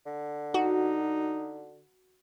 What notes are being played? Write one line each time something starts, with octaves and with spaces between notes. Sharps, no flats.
D3
D#4 F#4